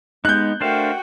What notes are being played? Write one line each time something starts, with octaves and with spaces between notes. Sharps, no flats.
G#3 B3 D#4 F#6 G6
A3 D4 F#4 A#4 C5 F5 G5